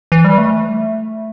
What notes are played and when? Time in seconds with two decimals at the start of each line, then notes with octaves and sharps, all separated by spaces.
0.12 E3
0.25 G3
0.38 A3